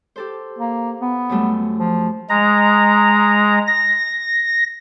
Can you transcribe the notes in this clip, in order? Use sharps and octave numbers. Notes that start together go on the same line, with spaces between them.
G4 A4 C5
A#3
B3
F#2 G3 A3
F3
G#3 A#5
A#6